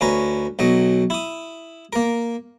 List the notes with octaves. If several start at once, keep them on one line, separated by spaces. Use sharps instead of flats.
D2 C#4 B4 A#5
B1 F#3 D#5
E4 D#6
A#3 A#4